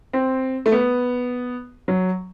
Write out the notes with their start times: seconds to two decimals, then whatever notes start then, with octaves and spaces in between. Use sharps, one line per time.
0.13 C4
0.66 A3
0.72 B3
1.88 F#3